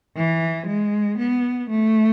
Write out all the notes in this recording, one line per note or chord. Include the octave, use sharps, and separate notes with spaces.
E3
G#3
B3
A3